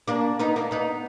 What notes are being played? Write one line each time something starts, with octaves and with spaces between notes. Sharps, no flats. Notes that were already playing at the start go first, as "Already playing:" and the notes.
A#3 D4
B3 D#4
A#3 D4
B3 D#4